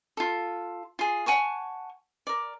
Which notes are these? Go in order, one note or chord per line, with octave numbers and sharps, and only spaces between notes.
F4 A4
F4 G#4
F#5 G#5 A5 C#6
A#4 D5